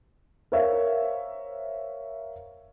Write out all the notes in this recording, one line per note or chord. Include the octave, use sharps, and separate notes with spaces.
A#4 C5 C#5 E5 F5